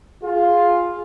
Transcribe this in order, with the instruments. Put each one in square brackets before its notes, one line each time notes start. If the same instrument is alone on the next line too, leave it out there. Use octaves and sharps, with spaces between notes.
[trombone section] F4 [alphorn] G#4